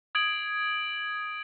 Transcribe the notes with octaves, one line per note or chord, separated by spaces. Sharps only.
D#6 G#6 D7 F#7